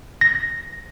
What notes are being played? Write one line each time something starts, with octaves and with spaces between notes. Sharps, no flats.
A#6